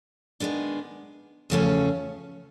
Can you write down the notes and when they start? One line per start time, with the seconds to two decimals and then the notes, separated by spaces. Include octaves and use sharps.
0.40 D#3 G#3 B3 D4
1.50 E2 C#3 F3 A3 C#4